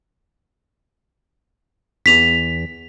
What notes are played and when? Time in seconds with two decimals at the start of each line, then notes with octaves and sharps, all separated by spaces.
2.06 E2 B6 F7